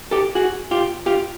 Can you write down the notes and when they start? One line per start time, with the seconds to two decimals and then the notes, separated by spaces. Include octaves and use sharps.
0.11 G4 A4
0.35 F#4 G#4
0.71 F4 G4
1.06 F4 G4